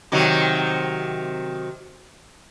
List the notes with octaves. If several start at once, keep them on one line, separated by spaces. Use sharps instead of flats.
C3 D#3 F#3